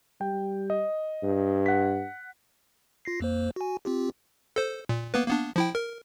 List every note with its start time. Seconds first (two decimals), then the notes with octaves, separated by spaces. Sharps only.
0.21 G3 G5
0.70 D#5
1.23 G2
1.66 F#5 B6
3.05 F4 A#6 C7
3.20 F2 A#3 C5
3.56 F#4 G#5
3.85 C4 F4 G4
4.56 A4 C5
4.89 A#2
5.14 A#3 B3 B4
5.28 A#3 B3 D4
5.56 F3 E4 G5
5.75 A#4